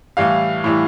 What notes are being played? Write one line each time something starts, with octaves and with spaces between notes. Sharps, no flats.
A2 E3 G3 F5
A2 E3 G3